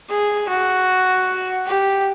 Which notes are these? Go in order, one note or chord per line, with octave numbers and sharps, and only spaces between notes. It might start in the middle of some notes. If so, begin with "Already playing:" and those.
G#4
F#4
G4